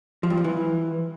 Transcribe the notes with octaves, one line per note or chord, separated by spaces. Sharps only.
F3
G2
F3
E3